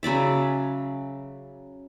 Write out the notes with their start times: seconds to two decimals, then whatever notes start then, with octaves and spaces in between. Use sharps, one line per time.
0.03 C#3 F#3 D5 E5